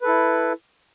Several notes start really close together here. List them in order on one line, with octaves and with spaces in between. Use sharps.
B4 A4 E4